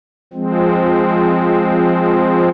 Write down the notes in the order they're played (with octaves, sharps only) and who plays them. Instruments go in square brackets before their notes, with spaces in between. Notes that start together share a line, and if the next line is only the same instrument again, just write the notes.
[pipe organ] F3 G#3 C4